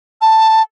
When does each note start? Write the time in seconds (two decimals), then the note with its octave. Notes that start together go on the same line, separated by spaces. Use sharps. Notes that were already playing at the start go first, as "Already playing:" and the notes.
0.21 A5